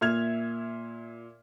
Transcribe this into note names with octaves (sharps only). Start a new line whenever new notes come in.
A#2 E5 F6 G#6 F7